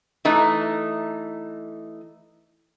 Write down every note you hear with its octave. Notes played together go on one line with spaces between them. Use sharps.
E3 A3 D#4